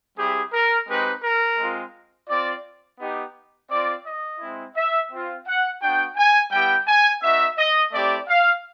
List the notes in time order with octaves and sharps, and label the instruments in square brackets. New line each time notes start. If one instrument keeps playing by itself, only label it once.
[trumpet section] G3 C4 E4 G4 G#4
A#4
G#3 C4 D#4 G4 B4
A#4
G#3 C4 F4
C4 F4 D5
B3 D#4 G4
C4 F4 D5
D#5
G#3 C4 E4
E5
C4 F4
F#5
B3 D4 F#4 G5
G#5
G3 B3 E4 G4 G5
G#5
B3 D#4 F#4 E5
D#5
A3 C4 E4 G4 D5
F5